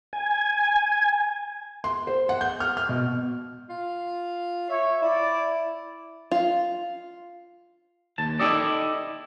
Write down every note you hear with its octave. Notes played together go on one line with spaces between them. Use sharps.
G#5
C6
C5
F#5
G6
F6
F6
B2
F4
C#5 E5
E4 D5
F4
D#2 A5
D#4 E4 G4 A4 D5 D#5